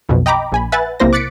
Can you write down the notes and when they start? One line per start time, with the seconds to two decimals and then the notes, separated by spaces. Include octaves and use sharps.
0.09 B1 F2 B2
0.26 D#5 G5 A#5 B5 D6
0.52 A#1 G#5 B5
0.72 B4 E5 F#5 G#5 F#6 A6
1.00 B1 C3 A#3 E4 C5 A#6
1.13 D6 F#6 A6 B6 C#7 D7